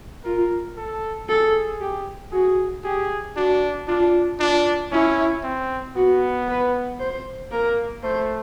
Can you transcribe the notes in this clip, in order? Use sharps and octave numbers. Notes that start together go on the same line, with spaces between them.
F4 A#4
A4
G#4 A4
G4
F#4 G#4
G4 G#4
D4 F#4
D4 F4
D4 F4
C#4 E4
C4
B3 F#4
B4
C5
A#3 A#4
A3 C5